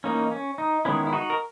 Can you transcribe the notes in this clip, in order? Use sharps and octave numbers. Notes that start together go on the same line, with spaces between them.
E3 A#3 C#4 D#4
C#4
D#4
D#3 G#3 B3 C#4 E4
E4
D#4 F#4
A#4